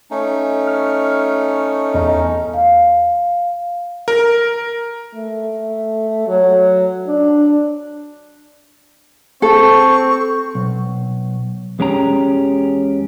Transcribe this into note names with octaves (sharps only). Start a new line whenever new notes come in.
A3 C#4 D#4
F6
E2 D#5 A#5
F5
A#4
A3
F#3
D4
C4 A4 C#6
B1
E2 G#3 C#4 G4 A#5